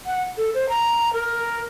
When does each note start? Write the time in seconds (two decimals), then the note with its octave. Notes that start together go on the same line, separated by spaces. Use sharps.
0.06 F#5
0.37 A4
0.54 C5
0.69 A#5
1.13 A#4